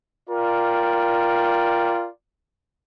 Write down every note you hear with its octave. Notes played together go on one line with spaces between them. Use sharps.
F4 A#4 D5 G5